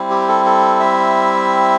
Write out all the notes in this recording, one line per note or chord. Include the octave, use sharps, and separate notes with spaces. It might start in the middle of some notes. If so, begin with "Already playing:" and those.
Already playing: G3 C4 E4
G4
A4
A4
E5